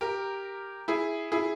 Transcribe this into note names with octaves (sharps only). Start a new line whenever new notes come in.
G4 A#4
E4 G#4
E4 G#4